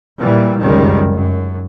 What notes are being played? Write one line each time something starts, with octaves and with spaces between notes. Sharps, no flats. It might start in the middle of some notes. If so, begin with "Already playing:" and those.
A#2 E3 G3
F1 C#2 F#2 D#3 G3 G#3
F#2